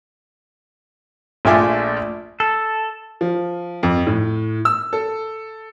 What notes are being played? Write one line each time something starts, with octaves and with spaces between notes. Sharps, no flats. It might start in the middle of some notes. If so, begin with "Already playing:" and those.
A#1 A3 F4 E5 G#5 D6
A4
F3
F2
A2
E6
A4